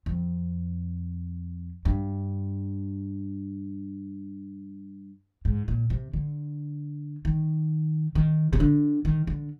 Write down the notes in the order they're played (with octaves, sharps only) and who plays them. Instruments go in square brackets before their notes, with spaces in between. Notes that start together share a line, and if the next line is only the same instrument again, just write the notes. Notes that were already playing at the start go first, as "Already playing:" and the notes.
[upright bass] F2
G2
G#2
A#2
C3
D3
D#3
D#3
C3
D3
D#3
D3